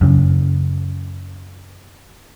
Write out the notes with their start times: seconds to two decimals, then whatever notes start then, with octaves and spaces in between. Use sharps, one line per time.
0.01 F#2 C#3